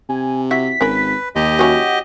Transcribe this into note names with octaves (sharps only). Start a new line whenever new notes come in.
C3 G#5
E4 F#4 E5 B6
G#1 C#4 A#4 B4 B5
D#2 G4 D#5
F#3 C#4 E4 F#4